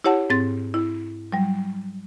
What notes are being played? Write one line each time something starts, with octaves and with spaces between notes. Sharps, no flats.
E4 G4 C#5 F#5 A5
G#2 C4 A6
E4
F#3 G3